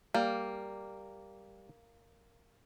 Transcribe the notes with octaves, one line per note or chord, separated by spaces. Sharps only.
G3 A#3